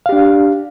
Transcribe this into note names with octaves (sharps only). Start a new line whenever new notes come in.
D4 G4 F5